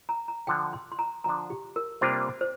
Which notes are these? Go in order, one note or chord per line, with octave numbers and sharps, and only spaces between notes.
A#5
A#5
D3 F3 D4 G5
C6
C6
A#5
D3 F3 D4 A#5
G4
A#4
C3 G3 A#3 D4 F4 C5
C5